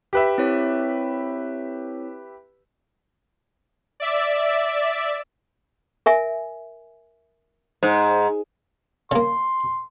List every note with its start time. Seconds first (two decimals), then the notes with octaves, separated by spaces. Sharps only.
0.13 G4 B4 E5
0.38 C4 E4 C#5
4.00 D5 E5
6.06 A#4 E5 G#5
7.83 G#2 C5
9.11 C#3 A#3 C6